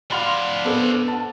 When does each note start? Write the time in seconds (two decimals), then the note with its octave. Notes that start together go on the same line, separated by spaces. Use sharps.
0.12 D4 F5 F#5 B5 C6
0.65 B3 A4 C5
1.08 F#5 A5